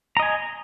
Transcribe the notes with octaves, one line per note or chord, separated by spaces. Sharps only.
D#5 G#5 A#5